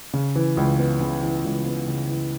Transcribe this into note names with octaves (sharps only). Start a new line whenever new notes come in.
C#3
E3
C#2
B3
C#3
E3
C#2
B3
C#3
E3